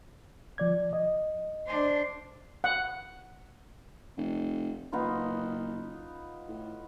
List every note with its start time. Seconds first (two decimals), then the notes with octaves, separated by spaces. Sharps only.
0.58 F3 D5 G#6
0.93 D#5
1.67 D4 C5
2.64 F#5
4.17 F1
4.92 F#1 B3 D#4 F4
6.48 A2